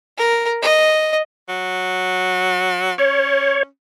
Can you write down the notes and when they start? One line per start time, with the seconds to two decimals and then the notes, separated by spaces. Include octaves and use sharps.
0.18 A#4
0.62 D#5
1.49 F#3
2.98 C#4 C#5